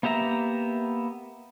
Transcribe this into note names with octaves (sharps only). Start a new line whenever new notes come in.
A#3 B3 G4 E5 A#5